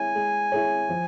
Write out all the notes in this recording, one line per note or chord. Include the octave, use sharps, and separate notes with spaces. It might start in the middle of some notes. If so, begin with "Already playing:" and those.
Already playing: G#3 E4 G#4 C#5 G#5
G#3
E4 G#4 C#5
F3